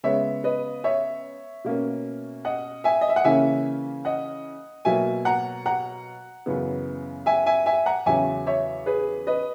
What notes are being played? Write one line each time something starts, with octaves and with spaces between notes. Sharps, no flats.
C#3 G#3 B3 C#5 E5
B4 D#5
C#5 E5
B2 A#3 C#4
D#5 F#5
E5 G#5
D#5
E5
F#5
C#3 E3 A#3 C#4 E5 G#5
D#5 F#5
B2 F#3 A#3 E5 G#5
F#5 A#5
F#5 A#5
F#2 C#3 E3 B3
E5 G#5
E5 G#5
E5 G#5
F#5 A#5
E2 C#3 F#3 C#4 E5 G#5
C#5 E5
G#4 B4
B4 D#5